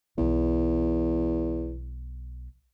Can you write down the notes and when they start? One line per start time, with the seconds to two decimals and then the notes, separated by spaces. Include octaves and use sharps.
0.18 B1 E2 E3